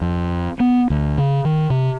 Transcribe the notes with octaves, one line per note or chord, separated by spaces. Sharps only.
F2
B3
D2
C#3
D#3
C3